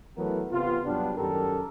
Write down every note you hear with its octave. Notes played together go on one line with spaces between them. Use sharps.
E3 F#3 A3 B3 A#4
C3 B3 F4
G2 F#3 G3 B3 D4
F#2 D#3 G4 A4 A#4